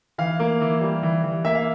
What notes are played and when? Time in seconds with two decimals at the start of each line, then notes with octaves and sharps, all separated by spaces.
0.18 E3 F5
0.40 A#3
0.61 E3
0.81 G3
1.03 E3
1.24 E3
1.45 A#3 E5
1.55 F5